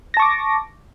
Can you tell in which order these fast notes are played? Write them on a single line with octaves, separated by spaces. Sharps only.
A#6 A5 C#6 D6